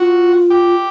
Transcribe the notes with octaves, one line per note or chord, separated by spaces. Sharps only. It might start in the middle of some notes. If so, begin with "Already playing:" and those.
Already playing: F4 F#4
G4